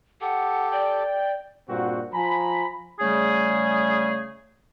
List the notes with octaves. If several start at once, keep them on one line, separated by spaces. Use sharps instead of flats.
G4 A4 F#5
D5 G5
G2 A#2 C4 F#4
F3 G#5 A#5 B5
C#3 G3 A3 G#4